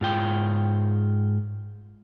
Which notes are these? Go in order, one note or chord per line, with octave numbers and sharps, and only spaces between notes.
G#2 F4 G5